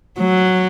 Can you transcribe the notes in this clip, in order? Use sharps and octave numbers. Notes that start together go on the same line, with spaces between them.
F#3